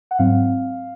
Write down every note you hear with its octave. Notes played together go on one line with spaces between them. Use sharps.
F#5
G#2 F#3 C4 F5